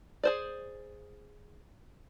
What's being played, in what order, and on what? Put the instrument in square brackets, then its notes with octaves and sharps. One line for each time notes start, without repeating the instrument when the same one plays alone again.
[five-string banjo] G#4 C5 D5